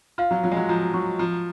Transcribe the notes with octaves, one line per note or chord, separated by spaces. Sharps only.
F4 F5
F#3
F#3 F4
G#3
F#3
F3 A#5
F#3 C#6
F3 A#5